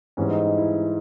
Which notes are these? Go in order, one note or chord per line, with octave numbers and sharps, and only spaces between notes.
G#2 E3 G3 C#4
D#4
D#4
E4